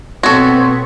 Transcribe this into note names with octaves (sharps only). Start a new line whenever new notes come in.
B2 B3 C4 F#4 A4 C#5